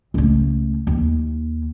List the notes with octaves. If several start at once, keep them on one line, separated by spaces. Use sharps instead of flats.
C#2 A3
D#2